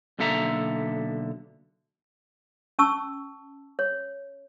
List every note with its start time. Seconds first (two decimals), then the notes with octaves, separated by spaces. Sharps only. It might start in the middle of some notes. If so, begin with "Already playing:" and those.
0.19 B1 D3 A#3 A4 E5 A#5
2.79 C#4 A5 C#6 E6
3.79 C#5